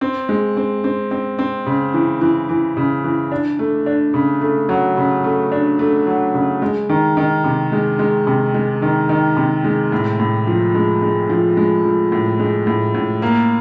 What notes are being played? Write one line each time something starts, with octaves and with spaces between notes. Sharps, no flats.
C4
G#3
C4
C4
C4
C4
C#3
E3
E3
E3
C#3
E3
D4
A3
D4
C#3
A3
F#3
C#3
A3
D4
A3
F#3
C#3
G#3
D#3
D#3
C3
G#3
G#3
C3
G#3
D#3
D#3
C3
G#3
A2
A2
F3
G#3
G#3
F3
G#3
F3
A2
G#3
A2
A2
A#3